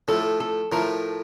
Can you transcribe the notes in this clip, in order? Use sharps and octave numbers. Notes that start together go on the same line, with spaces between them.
A2 F3 A3 A4
A4
A2 F3 A3 A#4